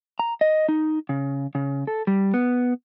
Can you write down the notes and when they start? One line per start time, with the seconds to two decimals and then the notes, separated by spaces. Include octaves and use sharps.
0.19 A#5
0.41 D#5
0.69 D#4
1.09 C#3
1.55 C#3
1.87 A4
2.07 G3
2.34 B3